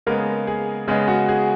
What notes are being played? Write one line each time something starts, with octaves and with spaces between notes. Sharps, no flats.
C#3 G#3 A#3 B3 A#4
G#4
C#3 G#3 B3 G#4
F#4
G#4